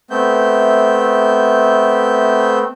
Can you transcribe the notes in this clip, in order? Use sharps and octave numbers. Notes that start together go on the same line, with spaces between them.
A3 B3 C4 E5 G6